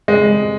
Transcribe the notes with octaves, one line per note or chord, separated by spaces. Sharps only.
G#3